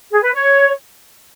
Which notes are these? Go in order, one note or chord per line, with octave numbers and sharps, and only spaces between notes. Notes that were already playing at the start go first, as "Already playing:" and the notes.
G#4
B4
C#5